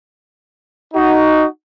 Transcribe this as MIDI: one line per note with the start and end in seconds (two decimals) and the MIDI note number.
0.94 1.45 63
0.94 1.45 66